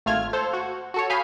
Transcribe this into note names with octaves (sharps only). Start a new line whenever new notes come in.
G#1 A3 F4 F6 G#6
A4 C5
F#4
F#4 A4 C#5
F5 G#5 B5 D#6 F6 G6